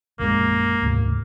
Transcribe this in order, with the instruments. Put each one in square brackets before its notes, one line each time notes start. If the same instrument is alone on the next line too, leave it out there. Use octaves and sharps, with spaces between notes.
[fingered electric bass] A#1 F#2 G#3 [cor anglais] A#3
[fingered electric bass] D2 G#2 C3